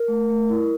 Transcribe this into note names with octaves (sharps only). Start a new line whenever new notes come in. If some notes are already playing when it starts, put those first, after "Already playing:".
Already playing: A#4
A3
A3
E4